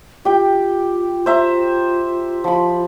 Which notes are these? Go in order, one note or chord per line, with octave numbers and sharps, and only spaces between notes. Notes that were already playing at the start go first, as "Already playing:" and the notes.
F4 G4 G5
C5 E5 A#5
F3 B5